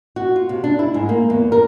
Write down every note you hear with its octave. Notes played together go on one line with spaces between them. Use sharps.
F#4
F4
C3
D4
E4
G#2
A#3
E2
A#4